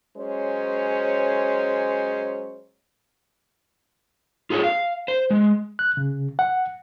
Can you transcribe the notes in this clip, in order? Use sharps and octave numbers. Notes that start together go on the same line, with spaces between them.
F#3 G#3 C#4 C5 C#5
F4 G#4 A4 C5 C#5
F5
C5
G#3
F#6
C#3
F#5